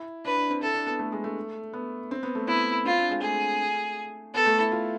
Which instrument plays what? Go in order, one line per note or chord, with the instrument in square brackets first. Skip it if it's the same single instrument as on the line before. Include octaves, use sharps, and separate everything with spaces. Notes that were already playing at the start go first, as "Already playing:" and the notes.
Already playing: [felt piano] E4
[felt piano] D4 [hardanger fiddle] B4
[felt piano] D4
C4
[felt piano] E4 [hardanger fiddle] A4
[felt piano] D4
B3
A3
G#3
A3
B3
C4
B3
A3
[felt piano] B3 [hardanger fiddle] E4
[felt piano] C4 [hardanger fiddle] F4
[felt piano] D4
G#3
[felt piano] A3 [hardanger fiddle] G#4
[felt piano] B3 [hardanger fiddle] A4
[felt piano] A3
E4
F4